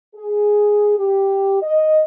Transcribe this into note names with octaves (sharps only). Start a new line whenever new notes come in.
G#4
G4
D#5